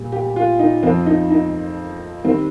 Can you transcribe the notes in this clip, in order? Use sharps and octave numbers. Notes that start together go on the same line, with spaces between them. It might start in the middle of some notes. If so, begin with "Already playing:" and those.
Already playing: A#2 G3
G4
F4
D#4
F2 F3 C4
D#4
D#4
D#3 G3 C4